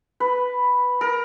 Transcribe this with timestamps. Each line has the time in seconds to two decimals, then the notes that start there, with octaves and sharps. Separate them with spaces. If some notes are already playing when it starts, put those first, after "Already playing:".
0.20 B4
1.01 A#4